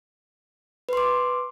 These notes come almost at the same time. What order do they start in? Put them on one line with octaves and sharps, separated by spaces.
B4 C6 D6